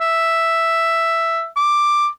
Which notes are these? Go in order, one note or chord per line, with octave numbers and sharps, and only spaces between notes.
E5
D6